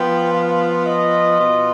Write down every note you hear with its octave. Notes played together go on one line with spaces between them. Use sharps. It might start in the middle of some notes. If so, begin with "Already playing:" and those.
Already playing: F3 B3 F4 G5
F5
D#5
B2 B3 F4